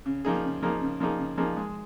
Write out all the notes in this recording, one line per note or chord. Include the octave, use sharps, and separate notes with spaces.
C#3
F3 A#3 D#4 G#4
C#3
F3 A#3 D#4 G#4
C#3
F3 A#3 D#4 G#4
C#3
F3 A#3 D#4 G#4
G#3